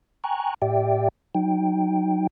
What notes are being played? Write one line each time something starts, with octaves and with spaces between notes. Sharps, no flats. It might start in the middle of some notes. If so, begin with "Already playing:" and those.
G5 G#5 A#5 C#6 F#6
A2 G4 D5 E5 G5
F#3 D#4 G5